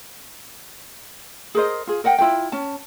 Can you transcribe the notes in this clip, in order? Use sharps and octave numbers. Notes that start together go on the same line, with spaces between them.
G#4 A#4 C5 D#5
F4 G#4
A#4 D#5 F#5 G5
E4 F4 B4 G5
C#4 A5